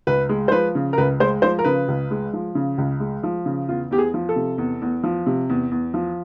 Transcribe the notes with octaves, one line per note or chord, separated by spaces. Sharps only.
C#2 B4
G#3
C5
F3 B4
C#3
A#4
C#2 B4
G#3 C5
F3 C5
A#4
C#3 B4
C#2
G#3
F3
C#3
C#2
G#3
F3
C#3
E2 F4
E2 G4
G#4
F3
A4
C3
E2
E2
F3
C3
E2
E2
F3